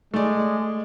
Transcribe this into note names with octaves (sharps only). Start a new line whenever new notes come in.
G#3 A3 D5